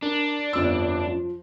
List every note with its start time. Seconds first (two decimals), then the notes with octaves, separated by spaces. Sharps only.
0.02 D4 A#4
0.53 G1 F2 E6
1.07 F3